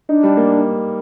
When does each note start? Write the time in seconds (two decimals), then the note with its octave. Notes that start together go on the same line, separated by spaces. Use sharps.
0.09 D4 D#4
0.23 G3
0.37 A#3